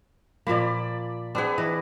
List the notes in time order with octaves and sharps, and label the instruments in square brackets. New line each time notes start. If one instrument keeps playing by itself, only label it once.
[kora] A#2 F3 A#3 [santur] D5 B5
[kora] C4 G#4 [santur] D4 B4 F#5
[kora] E3 D#5